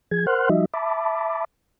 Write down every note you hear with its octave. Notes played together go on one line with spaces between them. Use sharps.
F3 G#4 G#6
A#4 C5 F#5 C6 F6 F#6
F3 G3 D#4 F#4 D#5 E5
E5 A5 B5 D6